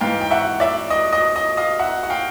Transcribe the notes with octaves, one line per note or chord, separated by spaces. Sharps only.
G#2 E3 F5 G5
G5
E5 F#5
D5 E5
D#5
D#5
D#5
D#5 F5
E5 F#5
F#5
F5 G5